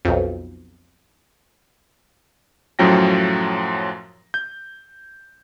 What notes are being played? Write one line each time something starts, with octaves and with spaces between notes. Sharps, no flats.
B1 F2
F#2 A2 F3 F#3 G5 A#6
G6